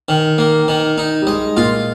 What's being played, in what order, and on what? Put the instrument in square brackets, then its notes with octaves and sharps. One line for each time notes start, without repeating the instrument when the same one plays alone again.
[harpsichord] D#3
A#3
D#3
D#4
[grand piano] G3
[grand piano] G#3 [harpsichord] D#5
[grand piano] A#2 [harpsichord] F4